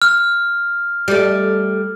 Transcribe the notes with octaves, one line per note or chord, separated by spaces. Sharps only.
F6
G3 A3